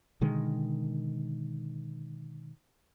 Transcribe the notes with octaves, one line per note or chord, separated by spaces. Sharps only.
B2 D3 D#3 G#3